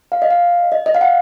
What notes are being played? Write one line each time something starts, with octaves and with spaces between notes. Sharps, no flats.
F5
D#5
F5
D#5
D#5
F5
F#5